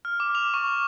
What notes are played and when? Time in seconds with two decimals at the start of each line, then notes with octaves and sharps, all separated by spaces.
0.05 F6
0.20 D6
0.35 F7
0.54 C#6